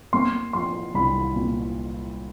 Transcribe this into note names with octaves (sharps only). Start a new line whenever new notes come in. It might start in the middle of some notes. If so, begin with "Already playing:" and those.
A#3 C6
F3 C6
C2 B5
A#2